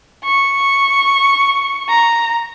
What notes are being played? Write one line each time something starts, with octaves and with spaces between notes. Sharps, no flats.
C#6
A#5